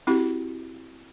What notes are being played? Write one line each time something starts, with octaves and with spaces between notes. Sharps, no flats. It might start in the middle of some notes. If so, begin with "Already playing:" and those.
C4 E4 F#4 G4